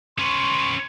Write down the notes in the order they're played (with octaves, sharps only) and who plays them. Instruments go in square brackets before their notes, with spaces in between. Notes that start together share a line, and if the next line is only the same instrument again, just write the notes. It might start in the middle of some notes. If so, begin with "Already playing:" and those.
[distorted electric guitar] C#4 B4 [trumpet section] C6 C#6